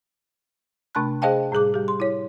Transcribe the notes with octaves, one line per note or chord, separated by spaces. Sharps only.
C3 A3 D4 A5 B5 F#6
G#4 C5 D#5 F5 G5 A5
A2 G3 G#4 D6
G3 G4
C6
E4 C#5